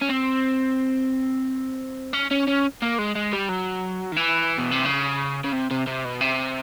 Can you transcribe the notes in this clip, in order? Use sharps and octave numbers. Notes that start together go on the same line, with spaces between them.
C#4
C4
C#4
C#4
C#4
A#3
G#3
G#3
G3
F#3
D#3
E3
B2
C3
C#3
C#3
C3
C3
C3
B2
C3